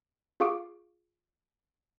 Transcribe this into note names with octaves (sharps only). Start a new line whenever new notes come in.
F4 G#4 F5 C#6 D6 D7